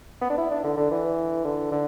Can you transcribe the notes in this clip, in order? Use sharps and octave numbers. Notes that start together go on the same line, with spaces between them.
B3
D4
E4
D4
D3
D3
E3
D3
D3